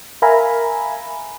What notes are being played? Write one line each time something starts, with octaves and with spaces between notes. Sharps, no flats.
A#4 E5 F5 G#5 A#5 B5